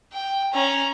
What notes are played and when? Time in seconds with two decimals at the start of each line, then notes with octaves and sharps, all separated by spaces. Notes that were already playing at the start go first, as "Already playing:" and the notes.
0.13 G5
0.54 C#4 A#5